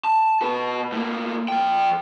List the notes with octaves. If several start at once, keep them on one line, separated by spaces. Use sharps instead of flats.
A5
B2 B4
A2 A#3
F3 G5